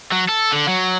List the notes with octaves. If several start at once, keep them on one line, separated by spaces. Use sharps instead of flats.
F#3
A4
D3
F#3